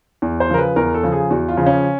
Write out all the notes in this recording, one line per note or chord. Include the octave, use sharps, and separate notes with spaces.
E2
C5
C#3 F3 A#4
B4
E2 A#4
A4
C#3 F3
G#4
E2 F#4
F4
C#3 F3
C#4